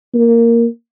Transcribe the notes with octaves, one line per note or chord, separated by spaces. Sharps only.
A#3